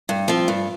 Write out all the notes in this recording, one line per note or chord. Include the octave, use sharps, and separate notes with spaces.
G2
F3 C4
G2